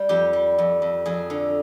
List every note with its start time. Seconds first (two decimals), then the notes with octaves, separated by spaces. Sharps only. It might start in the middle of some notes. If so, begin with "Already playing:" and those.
Already playing: G3
0.09 F2 G4
0.33 G3
0.58 F2
0.82 F2
1.06 F2 G#4
1.30 D3